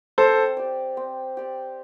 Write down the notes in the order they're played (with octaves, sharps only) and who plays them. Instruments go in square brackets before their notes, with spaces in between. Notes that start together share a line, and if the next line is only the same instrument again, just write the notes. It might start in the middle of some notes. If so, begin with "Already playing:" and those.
[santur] C4 [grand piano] A4 C5
[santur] G4 D5
C4
G4 D5